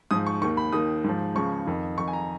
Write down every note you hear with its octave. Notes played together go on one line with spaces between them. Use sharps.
G#2 F3 D#6
C#6
D#2 D#3 C#6
B5
D#2 D#3 D#6
G#2 F3
C#2 C#3 F3 C#6
F2 D#3
F2 D#3 C#6
G#5
A#5